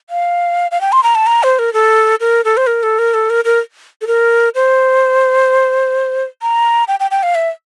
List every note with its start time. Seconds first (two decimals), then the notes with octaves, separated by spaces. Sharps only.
0.10 F5
0.71 F5
0.81 G5
0.92 C6
1.03 A#5
1.15 A5
1.26 A#5
1.43 C5
1.59 A#4
1.73 A4
2.20 A#4
2.45 A4
2.57 C5
2.67 A#4
2.83 A4
2.99 A#4
3.14 A4
3.30 A#4
3.45 A#4
4.01 A4
4.07 A#4
4.55 C5
6.42 A#5
6.88 G5
7.00 G5
7.11 G5
7.23 F5
7.35 E5